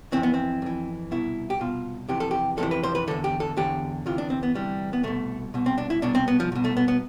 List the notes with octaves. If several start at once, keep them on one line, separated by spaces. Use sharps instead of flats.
F2 E3 C4
B3
C4
F2 E3
C2 B2 E4
G4
C2 B2 F4
F2 C3 E3 G4
A4
G4
F2 C3 E3 A4
B4
C5
B4
E2 D3 A4
G4
A4
E2 D3 G4
D2 C3 E3 F4
D4
C4
B3
D2 C3 E3 G3
B3
C2 B2 A3
C2 B2
C4
D4
E4
C2 B2 D4
C4
B3
F3
C2 B2
A3
B3
B3